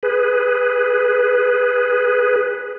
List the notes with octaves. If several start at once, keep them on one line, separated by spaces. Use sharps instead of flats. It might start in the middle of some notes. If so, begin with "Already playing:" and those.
G#4 B4